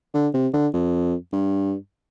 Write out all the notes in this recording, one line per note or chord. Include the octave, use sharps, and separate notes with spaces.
D3
C3
D3
F2
G2